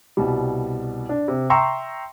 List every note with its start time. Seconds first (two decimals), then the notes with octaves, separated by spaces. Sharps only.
0.17 C2 B2 G3
1.09 D4
1.28 C3
1.50 E5 G5 A#5 C6 C#6 E6